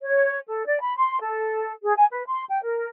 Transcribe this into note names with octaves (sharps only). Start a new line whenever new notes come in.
C#5
A4
D5
B5
C6
A4
G#4
G#5
B4
C6
G5
A#4